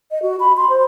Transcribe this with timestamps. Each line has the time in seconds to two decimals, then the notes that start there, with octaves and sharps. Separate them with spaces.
0.11 D#5
0.22 F#4
0.40 B5
0.57 C6
0.69 C5